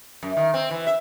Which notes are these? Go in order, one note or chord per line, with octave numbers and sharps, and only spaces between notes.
F#2
D#3
C4
E3
E5